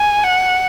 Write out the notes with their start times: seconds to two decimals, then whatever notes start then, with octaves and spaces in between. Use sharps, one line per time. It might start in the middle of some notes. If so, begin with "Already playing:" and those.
Already playing: G#5
0.23 F#5